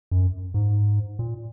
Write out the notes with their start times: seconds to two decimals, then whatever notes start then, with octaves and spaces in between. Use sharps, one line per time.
0.11 F#2
0.54 G#2
1.19 A#2